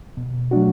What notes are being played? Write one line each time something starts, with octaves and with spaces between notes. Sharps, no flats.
B2
F#3 A3 D4 F#4